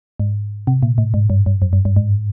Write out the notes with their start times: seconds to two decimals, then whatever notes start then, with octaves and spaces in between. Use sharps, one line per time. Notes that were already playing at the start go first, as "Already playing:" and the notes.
0.20 G#2
0.67 C3
0.83 A#2
0.98 A2
1.14 G#2
1.30 G2
1.46 G2
1.62 F#2
1.73 G2
1.85 G2
1.96 G#2